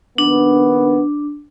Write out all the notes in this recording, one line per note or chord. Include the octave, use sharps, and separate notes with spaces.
A#1 D#3 B3 D4